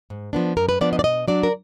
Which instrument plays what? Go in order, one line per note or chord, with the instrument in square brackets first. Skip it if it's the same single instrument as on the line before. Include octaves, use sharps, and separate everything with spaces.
[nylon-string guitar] G#2
F3 B3 D4
F#2 A#4
B4
F3 B3 D4 D5
D#5
D5
B2 D#5
F#3 D4 D5
A#4